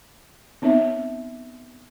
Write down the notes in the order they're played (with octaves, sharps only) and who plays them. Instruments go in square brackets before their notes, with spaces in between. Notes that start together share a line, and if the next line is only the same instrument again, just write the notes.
[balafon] B3 C4 D#4 C#5 E5